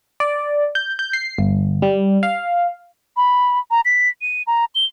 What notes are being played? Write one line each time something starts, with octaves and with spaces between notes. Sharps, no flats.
D5
G6
G6
C7
G1
G3
F5
B5
A#5
B6
D#7
A#5
G7